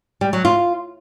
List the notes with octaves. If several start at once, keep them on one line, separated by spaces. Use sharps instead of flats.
G3
F#3
F4